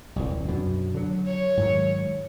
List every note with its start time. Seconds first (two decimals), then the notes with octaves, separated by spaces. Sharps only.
0.16 D#1 C2
0.48 F#2 B2 D3
0.94 D3 F#3
1.26 C#5
1.57 G#2 D#3 F#3